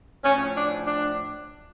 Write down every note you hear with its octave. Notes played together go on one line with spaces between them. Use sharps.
A2 F3 C#4
D4
D4